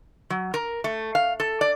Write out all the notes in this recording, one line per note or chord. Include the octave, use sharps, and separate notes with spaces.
F#3
A#4
A3
F5
A4
D5